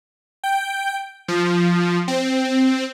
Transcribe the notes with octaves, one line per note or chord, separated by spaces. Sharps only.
G5
F3
C4